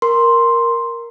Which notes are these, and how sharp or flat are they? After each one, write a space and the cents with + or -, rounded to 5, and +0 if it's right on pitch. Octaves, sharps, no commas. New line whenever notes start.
A#4 +0 C6 +0